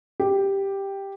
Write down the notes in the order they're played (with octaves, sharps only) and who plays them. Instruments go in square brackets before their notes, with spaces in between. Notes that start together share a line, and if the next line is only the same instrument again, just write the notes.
[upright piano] G4